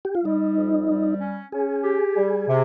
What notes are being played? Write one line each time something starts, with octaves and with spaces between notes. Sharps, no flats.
G4
F4
G3 D#4
F2
G3
C#4
C#4 G#4
G4
G3
C3